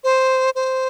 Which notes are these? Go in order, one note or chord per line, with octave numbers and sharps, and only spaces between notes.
C5
C5